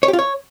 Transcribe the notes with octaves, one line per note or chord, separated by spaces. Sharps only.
C#5
G4
F4
C#5